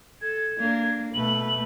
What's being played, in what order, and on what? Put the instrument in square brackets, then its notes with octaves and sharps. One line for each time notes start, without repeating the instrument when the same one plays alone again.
[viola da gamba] A4 [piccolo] G#6
[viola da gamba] A#3 D4
[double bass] B2 A3 [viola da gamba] B4 [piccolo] F#7